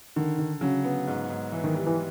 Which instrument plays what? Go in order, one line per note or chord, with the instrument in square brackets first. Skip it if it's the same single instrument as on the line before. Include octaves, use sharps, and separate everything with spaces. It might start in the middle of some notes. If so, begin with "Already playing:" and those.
[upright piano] D3 [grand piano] D#3
[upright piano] D3
[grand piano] C#3 [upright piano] F#3
[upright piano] B3
G#2
G#2
E3
[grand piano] D#3
[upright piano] G3
[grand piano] E3